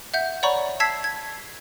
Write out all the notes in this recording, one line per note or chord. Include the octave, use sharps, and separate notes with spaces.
E5 F#5 G6
C#5 D5 F#5 A#5 B5 C#6
A5 E6 G#6 B6 C7
G#6